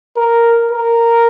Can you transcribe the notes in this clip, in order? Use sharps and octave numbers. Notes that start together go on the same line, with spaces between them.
A#4
A#4